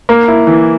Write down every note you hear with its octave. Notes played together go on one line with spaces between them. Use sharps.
A#3
E4
E3